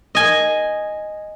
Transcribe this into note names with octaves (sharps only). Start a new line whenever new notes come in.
D#5 G#5